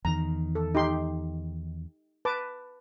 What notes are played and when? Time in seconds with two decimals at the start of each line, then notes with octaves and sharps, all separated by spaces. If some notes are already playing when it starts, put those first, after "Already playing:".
0.05 E2 D#3 A#5
0.55 A4
0.75 D#4 G4 C6
2.25 B4 A5 D6